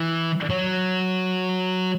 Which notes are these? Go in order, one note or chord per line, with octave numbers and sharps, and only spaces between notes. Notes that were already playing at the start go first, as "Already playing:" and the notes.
Already playing: E3
F#3